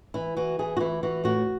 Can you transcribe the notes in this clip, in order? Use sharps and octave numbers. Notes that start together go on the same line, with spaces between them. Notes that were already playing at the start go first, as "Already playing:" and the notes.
E3 E4
E3 F#4
E3 G#4
F#4
E3 E4
E3 F#4
A2 F#4